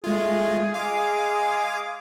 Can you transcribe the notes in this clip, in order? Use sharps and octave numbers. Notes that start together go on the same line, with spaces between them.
G#3 A3 F4 G#4
G#3 F5 D6